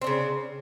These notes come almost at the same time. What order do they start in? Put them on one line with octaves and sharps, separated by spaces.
C4 D4 C#3